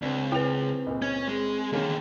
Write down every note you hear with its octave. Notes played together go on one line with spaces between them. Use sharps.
C#2 C4 D4
E4 B4 G5 F7
C#2 A#2
C#4 G#6
G#3
D3 D#3 G#3 A#3 C#4